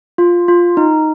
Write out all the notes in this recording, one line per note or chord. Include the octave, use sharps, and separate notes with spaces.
F4
F4
D#4